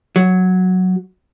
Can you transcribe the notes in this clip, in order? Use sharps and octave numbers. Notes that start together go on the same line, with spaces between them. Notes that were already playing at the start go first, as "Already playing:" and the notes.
F#3